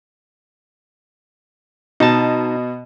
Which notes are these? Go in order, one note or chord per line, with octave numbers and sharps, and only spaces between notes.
B2 D#4 A5